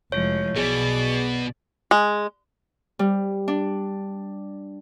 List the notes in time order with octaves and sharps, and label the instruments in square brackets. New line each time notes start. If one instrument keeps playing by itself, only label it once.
[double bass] F1 E4 [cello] F3 G#3 [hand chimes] C#5
[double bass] B1 [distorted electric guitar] B2 [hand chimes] G#4 [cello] D5
[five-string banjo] G#3
[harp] G3
D4